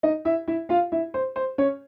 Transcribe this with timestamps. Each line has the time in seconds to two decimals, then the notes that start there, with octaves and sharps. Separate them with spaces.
0.03 D#4 D#5
0.25 E4 E5
0.48 E4 E5
0.69 F4 F5
0.92 E4 E5
1.14 C5
1.36 C5
1.58 C#4 C#5